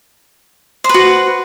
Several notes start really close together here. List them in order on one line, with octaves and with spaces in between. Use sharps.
C5 B4 F#4